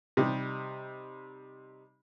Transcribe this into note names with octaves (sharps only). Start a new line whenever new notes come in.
C3 G3 D#4